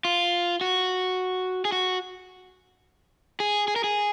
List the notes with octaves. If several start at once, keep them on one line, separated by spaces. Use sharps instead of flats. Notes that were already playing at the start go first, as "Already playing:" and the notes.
F4
F#4
G#4
F#4
G#4
G#4
A#4
G#4